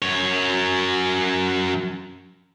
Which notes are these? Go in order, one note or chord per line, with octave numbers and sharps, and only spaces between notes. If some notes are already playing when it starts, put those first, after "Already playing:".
F#2 C#5